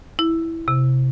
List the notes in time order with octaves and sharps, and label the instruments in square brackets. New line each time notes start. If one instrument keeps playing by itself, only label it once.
[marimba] E4
C3